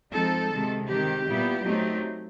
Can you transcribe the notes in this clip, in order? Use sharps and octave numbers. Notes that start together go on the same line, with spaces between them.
F3 G#3 C4 D#4 A4
C3 D#3 G#3
D#3 G#3 C4 G4
A#2 G3 B3 E4
F#3 A3 C4 D#4